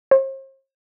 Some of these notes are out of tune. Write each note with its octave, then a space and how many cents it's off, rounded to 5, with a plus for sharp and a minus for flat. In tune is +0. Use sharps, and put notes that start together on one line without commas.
C5 +40